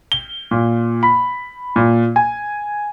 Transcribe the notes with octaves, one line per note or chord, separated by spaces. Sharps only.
G7
A#2
B5
A#2
G#5